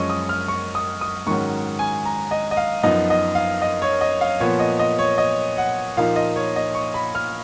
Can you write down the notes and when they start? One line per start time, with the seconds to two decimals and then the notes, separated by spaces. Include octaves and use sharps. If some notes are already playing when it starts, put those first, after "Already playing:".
Already playing: F#2 F3 G#3 C#4 D#5 C#6
0.10 D#6
0.29 F6
0.48 C#6
0.75 D#6
1.01 D#6
1.26 G#2 D#3 F#3 C#4 C#6
1.79 G#5
2.05 A#5
2.31 D#5
2.51 D#5
2.57 F5
2.83 F#2 F3 B3 D#4 D#5
3.10 D#5
3.35 F5
3.62 D#5
3.82 C#5
4.01 D#5
4.21 F5
4.40 A#2 F3 B3 C#5
4.60 D#5
4.79 D#5
4.99 C#5
5.18 D#5
5.58 F#5
5.97 A#2 F3 A#3 D#4 F5
6.16 D#5
6.36 C#5
6.56 D#5
6.75 C#6
6.94 B5
7.15 F6